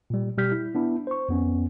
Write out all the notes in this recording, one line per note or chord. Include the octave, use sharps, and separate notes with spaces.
A#2 G3
B2 G3 G4 F6 G6 B6
E4
B3 D4 E4
C5 C#6
F2 B3 C#4